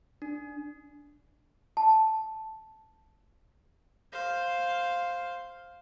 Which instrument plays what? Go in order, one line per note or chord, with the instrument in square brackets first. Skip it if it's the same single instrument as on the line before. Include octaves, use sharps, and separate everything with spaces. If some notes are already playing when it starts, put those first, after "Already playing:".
[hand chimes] D4
[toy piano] A5
[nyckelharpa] C5 F5